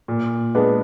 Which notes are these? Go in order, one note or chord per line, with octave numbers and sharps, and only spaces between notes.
A#2
G#3 B3 D4